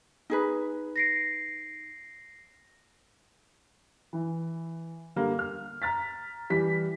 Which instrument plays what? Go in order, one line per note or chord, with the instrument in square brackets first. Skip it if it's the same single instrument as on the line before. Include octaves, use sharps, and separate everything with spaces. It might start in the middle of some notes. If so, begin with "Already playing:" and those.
[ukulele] D#4 G#4 B4
[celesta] A#6 C7 D7
[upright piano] E3
D3 G3 A#3
F6
A#5 F6 A6 B6
E3 G3 B6